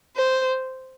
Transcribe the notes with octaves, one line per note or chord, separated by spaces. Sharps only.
C5